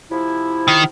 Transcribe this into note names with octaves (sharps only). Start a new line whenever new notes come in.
C3 F3 E4
D#3